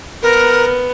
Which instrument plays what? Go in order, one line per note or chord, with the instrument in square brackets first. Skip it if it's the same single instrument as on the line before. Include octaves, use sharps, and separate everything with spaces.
[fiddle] B3 [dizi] A#4